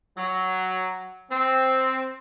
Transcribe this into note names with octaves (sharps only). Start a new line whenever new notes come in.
F#3
C4